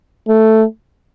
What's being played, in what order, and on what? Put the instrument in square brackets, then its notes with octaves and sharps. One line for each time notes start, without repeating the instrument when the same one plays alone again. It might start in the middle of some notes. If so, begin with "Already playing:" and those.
[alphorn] A3